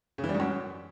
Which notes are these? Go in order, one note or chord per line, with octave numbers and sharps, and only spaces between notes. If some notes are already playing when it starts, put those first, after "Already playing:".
C#3
E3
G3
G#2
F#2